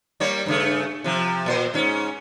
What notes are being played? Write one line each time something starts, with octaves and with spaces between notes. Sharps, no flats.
G3 A#3 C#5
G2 C#3 A3
C3 F3
A#2 A4 C5
G#2 C#4